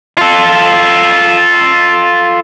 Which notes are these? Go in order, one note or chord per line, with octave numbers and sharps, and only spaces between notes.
F4 A4